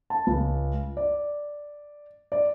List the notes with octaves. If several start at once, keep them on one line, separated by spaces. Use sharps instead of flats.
A5
C#2
D5
D5